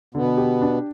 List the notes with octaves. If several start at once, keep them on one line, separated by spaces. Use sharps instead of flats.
B2 D3 B3
G4
D4